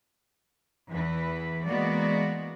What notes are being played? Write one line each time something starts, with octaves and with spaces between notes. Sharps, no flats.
E2 E3 B4
E3 G#3 A#3 B3 F#4 D5